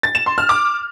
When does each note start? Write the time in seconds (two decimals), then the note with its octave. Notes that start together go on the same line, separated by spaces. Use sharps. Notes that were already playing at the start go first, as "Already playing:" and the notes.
0.03 A6
0.15 E7
0.26 C6
0.38 F6
0.49 D6